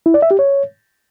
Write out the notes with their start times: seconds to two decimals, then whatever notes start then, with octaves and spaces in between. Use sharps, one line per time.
0.06 E4
0.14 D5
0.22 E5
0.31 G4
0.39 C#5